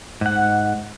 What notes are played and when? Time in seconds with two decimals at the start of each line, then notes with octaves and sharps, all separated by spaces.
0.21 G#2 F#5